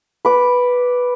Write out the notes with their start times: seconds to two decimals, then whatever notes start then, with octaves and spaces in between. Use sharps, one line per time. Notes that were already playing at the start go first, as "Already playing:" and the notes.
0.25 B4 D6